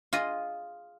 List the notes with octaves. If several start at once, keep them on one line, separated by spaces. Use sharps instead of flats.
F4 G#4 D#5